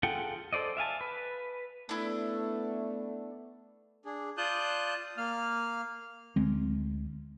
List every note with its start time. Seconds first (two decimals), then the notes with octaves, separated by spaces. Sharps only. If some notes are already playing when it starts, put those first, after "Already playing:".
0.03 F4 G#4 A4 F#5 G5
0.53 A4 C5 D5 D#5
0.77 E5 F5 G#5 A5
1.01 B4
1.89 A3 B3 D4 E4
4.05 D4 G#4
4.37 F4 D5 A5 D#6 F#6 G6
5.17 A#3 F5 F6
6.36 D2 G#3 C4